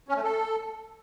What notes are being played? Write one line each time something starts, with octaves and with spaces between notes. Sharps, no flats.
C#4
A3
A4